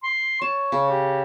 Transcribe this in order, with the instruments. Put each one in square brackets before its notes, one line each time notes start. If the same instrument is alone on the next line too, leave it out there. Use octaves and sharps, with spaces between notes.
[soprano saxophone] C6
[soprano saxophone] C#5 [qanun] A5
[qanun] C#3
[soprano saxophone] G4